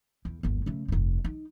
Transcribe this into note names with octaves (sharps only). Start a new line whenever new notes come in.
E2
G1 D#2
C#3 A3
F1 G2
D#4